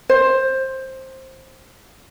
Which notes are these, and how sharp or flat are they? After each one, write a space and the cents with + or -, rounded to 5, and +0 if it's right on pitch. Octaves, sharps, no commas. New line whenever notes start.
C5 +15